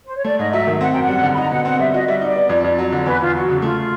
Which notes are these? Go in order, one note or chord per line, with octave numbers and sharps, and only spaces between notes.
C5
C#5
A3 D5
G#2 D#5
F#3 E5
D#3
C4 F#5
F#2 G5
F#5
G3
D3
B5
D#4 A#5
B2 F#5
C4 F#5
G3 E5
F#4 D#5
G3 E5
D#5
D#4 D5
B3
F2
F2
F#3
D3
C5
E2 B4
E2 F4
F#3 F#4
C#3
A3 F4